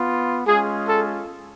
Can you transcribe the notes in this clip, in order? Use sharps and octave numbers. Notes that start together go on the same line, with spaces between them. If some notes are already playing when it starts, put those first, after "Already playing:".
Already playing: B3 F4
G#3 C#4 F4 G#4
A4